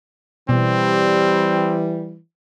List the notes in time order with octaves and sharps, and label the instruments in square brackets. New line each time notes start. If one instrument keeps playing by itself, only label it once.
[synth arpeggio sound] B2 [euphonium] E3 [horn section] G3 [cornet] C4